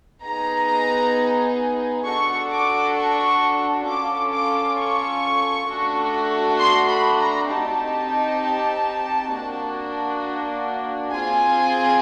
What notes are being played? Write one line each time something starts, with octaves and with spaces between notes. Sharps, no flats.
B3 D#4 G#4 A#5
D4 F#4 A4 C#6
D6
C#6
C#4 F4 A4 D6
D6
C#6
A3 D4 F#4 A4
C6
B5
A#5
C4 D#4 G4 A5
A#3 D4 F#4
C4 F4 G#4 G#5